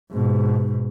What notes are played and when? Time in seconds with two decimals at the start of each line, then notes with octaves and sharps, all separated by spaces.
0.11 G#2 B2